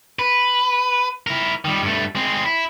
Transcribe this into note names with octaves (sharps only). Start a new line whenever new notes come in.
B4
E4 A#4
D#3 G3
G2 A3
G#3 C4
E4